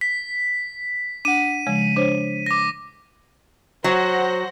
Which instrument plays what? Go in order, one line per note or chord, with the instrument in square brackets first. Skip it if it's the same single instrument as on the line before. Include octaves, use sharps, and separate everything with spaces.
[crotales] B6
[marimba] D4 F#5 [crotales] D#7
[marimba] C#3 F3 G#3
D4 C5 C#5
[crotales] D6 A#6
[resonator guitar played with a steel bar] F#3 [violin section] C5 F#5 A#6